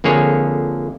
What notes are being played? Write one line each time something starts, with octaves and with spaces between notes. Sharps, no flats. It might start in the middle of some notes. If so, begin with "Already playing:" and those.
F2 D3 A#3 G#4 C#5